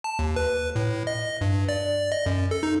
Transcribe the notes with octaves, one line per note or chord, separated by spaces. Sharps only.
A5
D#2
B4
A2
D#5
G2
D5
D#5
F#2
A4
D#4